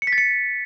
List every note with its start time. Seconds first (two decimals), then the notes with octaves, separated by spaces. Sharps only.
0.02 C#7
0.07 B6
0.13 A6
0.18 C#7